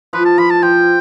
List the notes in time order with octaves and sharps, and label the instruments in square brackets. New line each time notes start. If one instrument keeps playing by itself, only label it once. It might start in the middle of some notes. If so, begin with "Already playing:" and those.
[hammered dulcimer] F3 [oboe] B4
[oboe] A5
[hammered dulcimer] F3 [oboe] B5
[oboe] A5
[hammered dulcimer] F3 [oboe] G5